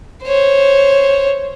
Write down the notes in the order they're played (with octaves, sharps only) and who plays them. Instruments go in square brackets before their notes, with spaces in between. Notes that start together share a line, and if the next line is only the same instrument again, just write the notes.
[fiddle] C5 C#5